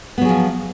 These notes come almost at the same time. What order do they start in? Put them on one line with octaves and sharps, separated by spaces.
B3 F#3 G#4 F3